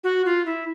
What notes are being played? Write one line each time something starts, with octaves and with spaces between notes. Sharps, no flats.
F#4
F4
E4